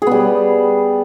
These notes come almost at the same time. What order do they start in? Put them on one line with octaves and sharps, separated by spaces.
G#4 B3 G3